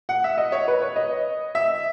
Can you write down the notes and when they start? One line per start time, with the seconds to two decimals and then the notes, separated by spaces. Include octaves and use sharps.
0.09 F#5
0.24 E5
0.38 D#5
0.52 C#5
0.68 B4
0.82 C#5
0.96 D#5
1.55 E5